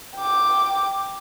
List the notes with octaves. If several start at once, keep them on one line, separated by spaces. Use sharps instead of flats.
G5 D6